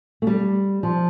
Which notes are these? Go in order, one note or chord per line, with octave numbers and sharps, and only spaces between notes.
A3
G3
F3